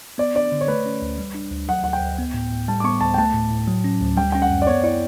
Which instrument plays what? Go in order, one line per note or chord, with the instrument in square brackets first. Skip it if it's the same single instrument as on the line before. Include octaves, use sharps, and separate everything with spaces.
[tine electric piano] B3 [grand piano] D5
[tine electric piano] D4 [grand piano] D5
[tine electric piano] D3
[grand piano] C#5
[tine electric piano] A3 [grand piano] B4
[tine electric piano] C#4
D2
G3
D4
D2
[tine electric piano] F#3 [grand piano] F#5
[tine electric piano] D2 [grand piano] F#5
[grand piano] G5
[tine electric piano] D2
B3
A2
A2
[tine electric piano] G3 [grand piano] A5
[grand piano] D6
[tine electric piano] B3 [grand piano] C#6
[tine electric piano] D2 [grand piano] A5
[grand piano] G5
[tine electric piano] A3 [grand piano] A5
[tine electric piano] A2
A2
F#3
C#4
D2
[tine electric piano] G3 [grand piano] G5
[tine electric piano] C#4 [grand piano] G5
[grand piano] F#5
[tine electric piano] F#2
[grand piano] D5
[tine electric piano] B3 [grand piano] C#5
[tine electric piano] E4 [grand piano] D5